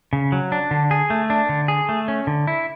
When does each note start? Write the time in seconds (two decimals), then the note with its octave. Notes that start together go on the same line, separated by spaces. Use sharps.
0.13 C#3
0.32 F#3
0.52 D4
0.71 D3
0.91 G#4
1.10 A3
1.30 D4
1.49 D3
1.68 G#4
1.89 A3
2.08 C#4
2.27 D3
2.47 E4